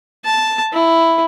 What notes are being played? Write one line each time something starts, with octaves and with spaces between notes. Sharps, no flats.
A5
E4